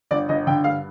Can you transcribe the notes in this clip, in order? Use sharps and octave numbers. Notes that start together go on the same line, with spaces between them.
G1 D5
G1 D#5
D3 G5
G2 F5